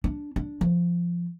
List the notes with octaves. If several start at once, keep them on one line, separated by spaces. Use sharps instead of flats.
D4
D4
F3